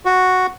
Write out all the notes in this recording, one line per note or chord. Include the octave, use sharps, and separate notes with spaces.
F#4